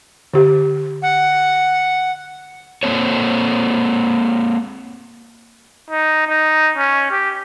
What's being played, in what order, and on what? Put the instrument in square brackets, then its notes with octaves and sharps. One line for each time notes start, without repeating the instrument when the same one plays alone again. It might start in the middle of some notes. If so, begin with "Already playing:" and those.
[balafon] D3 G4
[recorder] F#5
[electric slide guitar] A#3 C4 A4 C#5
[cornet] D#4
D#4
C#4
G4